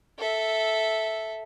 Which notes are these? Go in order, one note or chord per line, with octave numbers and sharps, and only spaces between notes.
A4 E5